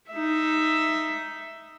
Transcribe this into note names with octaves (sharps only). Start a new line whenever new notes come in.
D#4 E5